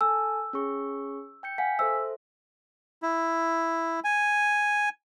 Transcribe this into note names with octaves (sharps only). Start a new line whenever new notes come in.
A4 G#5 A5 E6
C#4 G#4 C#6
G5 G6 C#7
F5 F#5 G#5 B6
A4 C5 E5 E6
E4
G#5